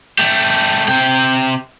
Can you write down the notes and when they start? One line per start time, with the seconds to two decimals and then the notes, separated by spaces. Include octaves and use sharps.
0.19 A3 G4
0.88 C3 G5